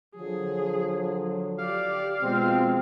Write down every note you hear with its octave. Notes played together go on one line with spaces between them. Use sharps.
D3 F3 F#3 G#4
G4 D5 F5
B2 F3 G#3 C4 F4